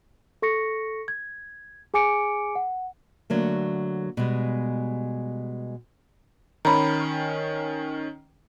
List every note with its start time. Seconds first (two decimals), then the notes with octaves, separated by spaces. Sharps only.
0.42 A4 C#6 A#6 C#7
1.08 G#6
1.94 G#4 G#5 D6 C#7 D7
2.55 F#5
3.30 D3 F#3 A3 A#3
4.17 B2 G3 G#3
6.65 D#3 C#4 A#5 B5